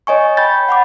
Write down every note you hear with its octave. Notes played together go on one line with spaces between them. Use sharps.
C#5 D#5 G#5 C#6
G5 B5 G6 A6
F#5 B5 D6